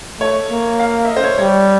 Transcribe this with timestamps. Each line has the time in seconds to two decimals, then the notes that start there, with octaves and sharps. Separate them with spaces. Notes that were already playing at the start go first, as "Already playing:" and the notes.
0.20 A3 C#5
0.50 A#3
0.80 F5
1.05 E5
1.09 D#5
1.17 C5
1.24 C#5
1.38 G3 C#5